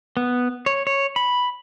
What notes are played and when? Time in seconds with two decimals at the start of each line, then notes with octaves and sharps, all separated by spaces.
0.17 B3
0.66 C#5
0.87 C#5
1.16 B5